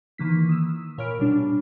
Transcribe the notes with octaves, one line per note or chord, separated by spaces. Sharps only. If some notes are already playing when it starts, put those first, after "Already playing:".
D#3 E3 A#3 B6
D#6 E6
A#2 A#4 C#5 B5 F6 D7
B2 G3 D4